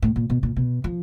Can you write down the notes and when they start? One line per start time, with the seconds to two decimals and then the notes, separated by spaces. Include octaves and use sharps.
0.02 A2
0.16 A#2
0.30 B2
0.43 A#2
0.56 B2
0.84 F3